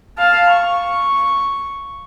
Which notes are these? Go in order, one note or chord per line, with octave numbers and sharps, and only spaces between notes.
F5 A5
C#6